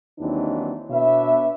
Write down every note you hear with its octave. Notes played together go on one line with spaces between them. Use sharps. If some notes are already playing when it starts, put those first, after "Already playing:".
D#2 E3 F#3 C4 D4 D#4
B2 B3 D4 B4 C#5 E5